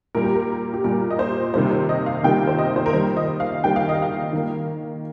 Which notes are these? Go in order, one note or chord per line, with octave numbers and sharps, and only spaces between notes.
A#2 G3 A#3 A#4
G4
A#4
G4
A#2 G3 A#3 A#4
D#5
C5
C3 D#3 G3 A#3 C5
C5
D#5
F5
C3 D#3 G3 A#3 G5
C5
D#5
C5
A#4
D#3 G3 A#3 C5
D#5
F5
D#3 G3 A#3 G5
F5
D#5
F5
D#3 A#3